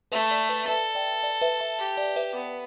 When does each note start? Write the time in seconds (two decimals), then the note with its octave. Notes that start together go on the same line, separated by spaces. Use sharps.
0.12 A3 B4 E5
0.31 D5
0.49 B4 E5
0.67 A4 B4 E5
0.95 D5 G5
1.23 D5
1.42 B4 E5
1.60 E5 A5
1.79 G4
1.97 D5 G5
2.16 B4 E5
2.35 B3